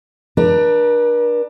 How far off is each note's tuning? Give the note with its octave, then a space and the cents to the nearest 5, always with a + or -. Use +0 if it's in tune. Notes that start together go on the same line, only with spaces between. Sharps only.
D4 +20 A#4 +45